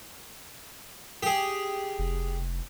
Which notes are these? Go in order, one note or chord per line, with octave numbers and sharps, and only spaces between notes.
G4 G#4
F1